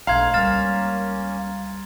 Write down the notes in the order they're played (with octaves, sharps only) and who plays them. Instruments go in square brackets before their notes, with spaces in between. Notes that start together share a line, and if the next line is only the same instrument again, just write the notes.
[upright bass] A#1 [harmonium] G#2 A3 [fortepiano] F5 [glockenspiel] A#5 C6 G#6
[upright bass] C#2 G3 [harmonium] A#3 C#4 [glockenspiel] F6 A6 E7